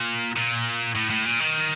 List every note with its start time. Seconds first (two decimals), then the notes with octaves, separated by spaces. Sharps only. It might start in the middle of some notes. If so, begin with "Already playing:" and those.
Already playing: A#2
0.36 A#2
0.95 A2
1.10 A2
1.26 A#2
1.40 D#3